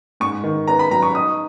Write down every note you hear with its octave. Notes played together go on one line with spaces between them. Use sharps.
G#2 C#6
D#3
B3 A#5
B5
F#3 A#5
C#6
D#4 D#6